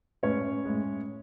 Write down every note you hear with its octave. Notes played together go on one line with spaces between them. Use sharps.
A2 G#3 C#4 C#5
A2 G#3